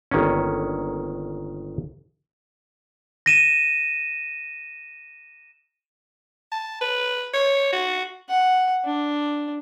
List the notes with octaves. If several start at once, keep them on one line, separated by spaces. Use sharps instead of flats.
G1 D#3 A#3 C#4
A#6 D#7 E7
A5
B4
C#5
F#4
F#5
D4